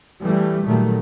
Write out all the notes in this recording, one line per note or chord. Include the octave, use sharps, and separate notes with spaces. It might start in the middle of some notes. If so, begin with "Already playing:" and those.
E3 G3 A3
A#2 D#3 F#3 G3 A3